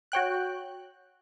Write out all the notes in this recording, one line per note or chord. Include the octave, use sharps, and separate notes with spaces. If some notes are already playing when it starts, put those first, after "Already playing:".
F#4 C#5 G5 F#6